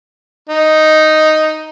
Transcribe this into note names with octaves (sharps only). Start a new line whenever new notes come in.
D#4